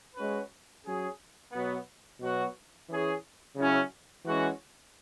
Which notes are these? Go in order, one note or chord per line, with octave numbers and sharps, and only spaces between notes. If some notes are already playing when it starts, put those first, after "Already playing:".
G#3 C#4 F#4 B4
F#3 C#4 G#4
B2 F#3 B3
B2 F#3 B3 F#4
E3 C#4 G#4
C#3 F#3 C#4 E4
E3 G#3 C#4 F#4